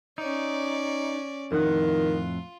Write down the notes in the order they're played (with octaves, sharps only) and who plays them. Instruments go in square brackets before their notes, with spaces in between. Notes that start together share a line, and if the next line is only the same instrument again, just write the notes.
[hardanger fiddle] C#4 D5 [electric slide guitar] D#4
[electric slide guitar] F2 A2 F#5 [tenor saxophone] D#3 [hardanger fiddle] F4